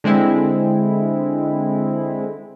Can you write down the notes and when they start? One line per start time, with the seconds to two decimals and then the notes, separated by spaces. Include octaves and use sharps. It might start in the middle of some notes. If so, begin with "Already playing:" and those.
0.04 D3 G#3 C4 E4